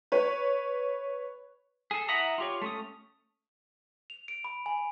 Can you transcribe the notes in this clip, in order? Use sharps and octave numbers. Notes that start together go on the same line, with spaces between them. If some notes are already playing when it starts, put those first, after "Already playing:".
B4 C#5
G#4 A4
E4 E5 F#5 A#5 D#6
F4 G4 C#5
A3 C#4 D#6
F7
D7
B5
G#5